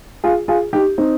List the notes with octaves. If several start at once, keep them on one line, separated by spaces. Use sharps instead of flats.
F4 G#4
F4 G#4
D#4 G4
C4 D#4